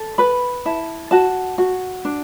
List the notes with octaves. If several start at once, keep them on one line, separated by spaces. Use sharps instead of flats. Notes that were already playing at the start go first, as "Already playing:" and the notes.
Already playing: A4
B4 B5
E4 A5
F#4 A5
F#4
D4